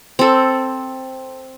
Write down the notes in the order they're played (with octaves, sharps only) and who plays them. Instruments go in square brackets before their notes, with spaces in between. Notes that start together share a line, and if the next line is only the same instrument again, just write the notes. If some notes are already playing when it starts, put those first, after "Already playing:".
[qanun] C4 A4